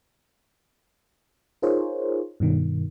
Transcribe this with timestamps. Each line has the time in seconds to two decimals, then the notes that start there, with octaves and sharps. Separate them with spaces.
1.62 D#4 F4 G#4 A#4 C5 C#5
2.40 G2 B2 D#3